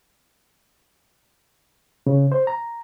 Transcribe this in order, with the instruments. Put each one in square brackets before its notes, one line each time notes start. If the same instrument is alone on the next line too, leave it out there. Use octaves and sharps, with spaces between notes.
[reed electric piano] C#3
C5
A#5